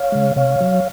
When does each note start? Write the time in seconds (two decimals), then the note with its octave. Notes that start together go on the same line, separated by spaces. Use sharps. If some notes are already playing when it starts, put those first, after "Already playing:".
Already playing: C#5 F5
0.12 C#3 G#3
0.36 C3 C#5 F5
0.61 F#3